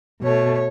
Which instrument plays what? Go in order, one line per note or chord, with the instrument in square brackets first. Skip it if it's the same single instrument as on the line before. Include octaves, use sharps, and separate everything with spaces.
[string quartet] B2 A3 C#5